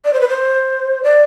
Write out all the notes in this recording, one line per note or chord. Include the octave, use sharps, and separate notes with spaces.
D5
C5
B4
C5
D5